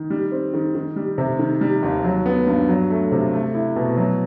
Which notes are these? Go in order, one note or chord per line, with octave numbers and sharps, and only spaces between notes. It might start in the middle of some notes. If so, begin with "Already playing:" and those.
Already playing: D#3
G3
C4
D#3
D#3
G3
C3
D#3
G3
D#2
F#3
B3
G2
F#3
A3
C3
A3
E4
B2
F#3